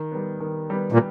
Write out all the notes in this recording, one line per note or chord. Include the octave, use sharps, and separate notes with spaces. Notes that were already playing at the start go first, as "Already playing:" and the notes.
Already playing: D#3
G3 B3
D#3
G3 B3
A#2